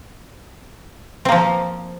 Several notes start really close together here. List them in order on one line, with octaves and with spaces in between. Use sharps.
C4 A#3 F3